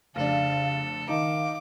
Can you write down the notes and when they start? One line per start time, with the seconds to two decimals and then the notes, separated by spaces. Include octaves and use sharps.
0.16 F1 C#3 D4 A4 F5
1.09 D#3 D#4 F5 D6